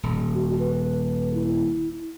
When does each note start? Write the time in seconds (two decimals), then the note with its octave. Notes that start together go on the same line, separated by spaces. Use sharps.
0.03 D#1
0.34 F#4
0.59 B4
1.34 E4